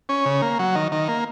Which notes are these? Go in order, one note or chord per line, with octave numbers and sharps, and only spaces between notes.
C#4
C#3
A#3
F#3
D#3
D#3
A#3